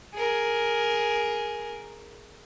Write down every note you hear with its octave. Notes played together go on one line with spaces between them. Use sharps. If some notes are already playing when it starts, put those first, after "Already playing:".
G#4 A#4